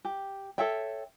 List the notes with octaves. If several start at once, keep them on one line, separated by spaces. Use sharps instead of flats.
G4
A4 C#5 E5 G5